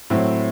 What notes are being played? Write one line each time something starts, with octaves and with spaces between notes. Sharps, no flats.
A2 F#3 C4 E4